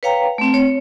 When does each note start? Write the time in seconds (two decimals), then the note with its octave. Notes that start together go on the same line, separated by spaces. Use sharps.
0.03 B4 C#5 F5 G5 A#5
0.38 A3 C4
0.54 C#5